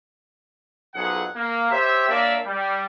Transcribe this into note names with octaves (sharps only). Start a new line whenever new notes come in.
B1 F2 F#3 G#4 F#5
A#3
G4 C5 C#5 E5
A#3 D4 C#5 D5 E5
G3